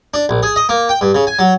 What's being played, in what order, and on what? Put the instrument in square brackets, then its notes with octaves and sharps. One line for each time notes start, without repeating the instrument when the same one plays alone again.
[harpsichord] D4
A#1
G#4
D#5
A#3
G5
G2
C#3
G#5
F#3